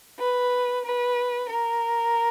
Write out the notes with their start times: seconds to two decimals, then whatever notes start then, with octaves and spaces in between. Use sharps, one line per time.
0.19 B4
0.85 B4
1.50 A#4